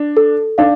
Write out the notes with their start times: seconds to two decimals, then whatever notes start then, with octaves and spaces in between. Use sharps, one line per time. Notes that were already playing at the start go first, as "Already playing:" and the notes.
Already playing: D4
0.17 A4
0.58 D4 F5